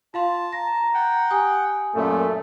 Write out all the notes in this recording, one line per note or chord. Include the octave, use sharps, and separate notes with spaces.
F4 F5 A5 C6
A#5 A#6
F#5 G5
G4 G#5 D#6
F#2 A#2 A3